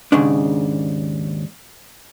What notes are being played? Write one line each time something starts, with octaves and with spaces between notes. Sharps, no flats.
D#2 G#2 C#3 D4